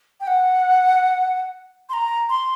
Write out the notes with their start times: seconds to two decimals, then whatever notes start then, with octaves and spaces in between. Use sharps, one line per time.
0.21 G5
0.27 F#5
1.89 C6
1.93 A#5
2.30 C6